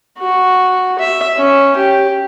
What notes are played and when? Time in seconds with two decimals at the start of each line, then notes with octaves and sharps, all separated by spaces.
0.18 F#4
0.99 E5
1.36 C#4
1.76 G4